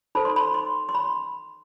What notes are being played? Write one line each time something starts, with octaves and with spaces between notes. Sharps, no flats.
D#4 A4 C5 B5
C6
B5
C6
C6
B5